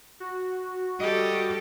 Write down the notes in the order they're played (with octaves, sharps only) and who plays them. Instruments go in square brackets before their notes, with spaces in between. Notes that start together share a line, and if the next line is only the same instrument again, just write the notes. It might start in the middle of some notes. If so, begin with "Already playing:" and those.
[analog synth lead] F#4
[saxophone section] G3 D#5 [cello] G4 A4